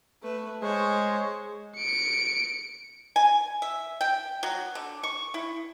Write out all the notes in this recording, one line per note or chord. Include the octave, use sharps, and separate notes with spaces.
A3 B4
G#3 C5 C#5
C#7 D7
G#5
E5
G5
F#3
D3
C#6
E4